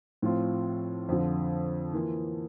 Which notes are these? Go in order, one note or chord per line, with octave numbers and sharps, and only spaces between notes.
A2 F3 C4 F4
F2 D3 F3
E3 A#3 F4